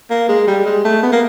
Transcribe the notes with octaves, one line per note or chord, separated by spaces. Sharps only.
A#3
G#3
G3
G#3
A3
B3
A#3